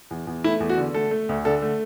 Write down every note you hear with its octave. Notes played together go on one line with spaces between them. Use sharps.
E2
E2
A3 E4
E2
F#4
D3
A3 A4
A3
D2
D3 A4
A3